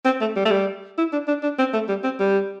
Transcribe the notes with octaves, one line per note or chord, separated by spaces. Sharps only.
C4
A3
G3
A3
G3
E4
D4
D4
D4
C4
A3
G3
C4
G3